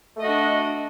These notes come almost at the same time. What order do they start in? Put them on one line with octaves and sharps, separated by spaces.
A3 D#5 F#4 D4